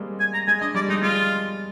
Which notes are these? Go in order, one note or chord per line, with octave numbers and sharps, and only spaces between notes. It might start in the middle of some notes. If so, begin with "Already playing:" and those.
Already playing: G3 G#3 A#3 C4
G#5
A#5
G#3 G#5
D4 D#5
G3 D5
G#3 D#4
G#3 F4